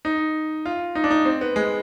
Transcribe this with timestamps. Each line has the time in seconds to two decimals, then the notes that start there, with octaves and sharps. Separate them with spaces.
0.05 D#4
0.66 F4
0.95 D#4
1.04 D4
1.11 D#4
1.25 C4
1.41 B3
1.56 G#3